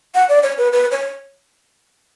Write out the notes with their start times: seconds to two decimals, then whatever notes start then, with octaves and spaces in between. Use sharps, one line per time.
0.15 F#5
0.29 D5
0.43 C#5
0.58 B4
0.73 B4
0.92 C#5